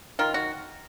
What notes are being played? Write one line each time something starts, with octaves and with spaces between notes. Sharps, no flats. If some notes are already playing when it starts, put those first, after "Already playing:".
D#3 F4
F#4